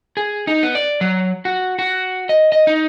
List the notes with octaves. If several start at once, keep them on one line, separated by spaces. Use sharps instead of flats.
G#4
D#4
B3
D5
F#3
F#4
F#4
D#5
D#5
D#4